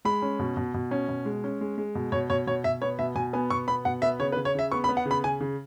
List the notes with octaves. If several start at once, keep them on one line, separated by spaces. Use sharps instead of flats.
G#3 B5
C#4
B2
B2
B2
C#4
B2
G#3
C#4
G#3
G#3
B2
B2 C#5
B2 C#5
B2 C#5
B2 E5
B3 C#5
B2 E5
B2 G#5
B3 G#5
B2 C#6
B3 B5
B2 F#5
B3 E5
C#3 C#5
B4
C#3
C#5
C#3 E5
B3 C#6
B5
B3
F#5
C#3
B5
C#3 G#5
C#3